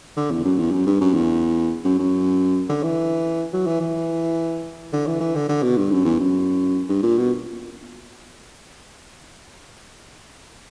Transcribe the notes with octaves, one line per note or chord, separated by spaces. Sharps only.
D3
E2
F#2
E2
F#2
G2
F#2
E2
F#2
F#2
D3
E3
F#3
E3
E3
D3
E3
E3
D3
D3
B2
G2
F#2
E2
F#2
G2
A#2
B2